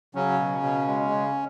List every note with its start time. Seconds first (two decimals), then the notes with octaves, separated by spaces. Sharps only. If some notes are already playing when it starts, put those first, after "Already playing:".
0.15 C#3 F#3 C#4
0.39 B2
0.63 B2
0.87 G#3
1.11 C#3